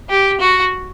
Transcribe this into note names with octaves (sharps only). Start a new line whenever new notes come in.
G4
F#4